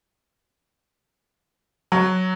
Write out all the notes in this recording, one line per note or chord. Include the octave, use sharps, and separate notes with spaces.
F#3